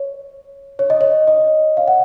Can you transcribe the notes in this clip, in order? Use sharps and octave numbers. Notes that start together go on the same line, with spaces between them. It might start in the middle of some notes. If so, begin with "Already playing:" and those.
Already playing: C#5
C#5
D#5
C#5
D#5
F5
F#5